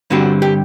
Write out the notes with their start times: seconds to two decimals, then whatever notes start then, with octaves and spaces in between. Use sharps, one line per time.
0.10 G2 D3 G3 C4 F#4
0.42 G4